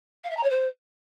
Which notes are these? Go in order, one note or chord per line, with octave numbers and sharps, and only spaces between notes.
F5
E5
A#5
C#5
C5